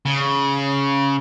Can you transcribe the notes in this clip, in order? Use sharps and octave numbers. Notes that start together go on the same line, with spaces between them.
C#3